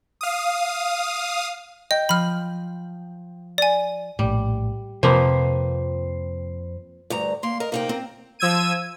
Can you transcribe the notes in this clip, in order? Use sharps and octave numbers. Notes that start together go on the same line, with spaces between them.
F5 D#6
D#5 G5
F3 B5 F6
D5 G#5
A#1 A2 G3
F2 C3 F3 A#3 C4 B4 C5
D2 G2 A#5
A#3 C6
A#4 D#5
C3 A#3 D#4 G5
C4
F3 E6 G#6 D#7